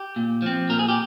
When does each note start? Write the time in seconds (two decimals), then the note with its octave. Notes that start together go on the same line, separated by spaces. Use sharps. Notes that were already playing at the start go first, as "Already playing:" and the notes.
Already playing: G4
0.16 A#2
0.42 F3 C4
0.69 A#2 A#4
0.79 G#4
0.88 G4